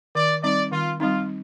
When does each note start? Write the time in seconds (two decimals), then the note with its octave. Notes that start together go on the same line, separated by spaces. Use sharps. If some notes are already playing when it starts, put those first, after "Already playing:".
0.15 D#3 D5
0.43 G3 C4 D#4 D5
0.72 D#3 F4
1.00 G3 C4 D#4 F4